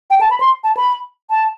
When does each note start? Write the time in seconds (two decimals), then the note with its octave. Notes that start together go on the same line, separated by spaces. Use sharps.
0.10 G5
0.21 A5
0.31 B5
0.40 C6
0.64 A5
0.77 B5
1.30 A5